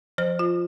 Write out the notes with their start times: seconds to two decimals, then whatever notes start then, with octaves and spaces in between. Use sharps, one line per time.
0.18 F3 C5
0.39 F4